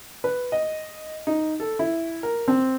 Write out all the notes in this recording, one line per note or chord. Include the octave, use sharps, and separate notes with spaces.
B4
D#5
D#4
A4
E4
A#4
C4